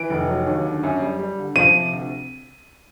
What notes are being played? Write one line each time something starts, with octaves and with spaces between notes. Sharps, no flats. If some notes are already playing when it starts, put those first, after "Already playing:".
Already playing: E3 D7
F1
F#3
D#2
D3
F#2
G3
G3
D3
F3 D#7
C3
D2